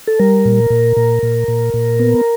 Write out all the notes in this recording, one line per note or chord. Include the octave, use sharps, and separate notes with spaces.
A4
G3 A#4
A#2
A#2
A#2
A#2
A#2
A#2
B3